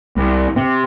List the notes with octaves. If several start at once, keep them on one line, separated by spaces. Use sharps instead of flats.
C2
C3